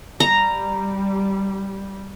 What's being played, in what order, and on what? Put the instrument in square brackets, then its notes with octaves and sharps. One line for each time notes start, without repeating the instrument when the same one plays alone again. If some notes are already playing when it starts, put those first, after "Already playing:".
[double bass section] G3 [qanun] A#5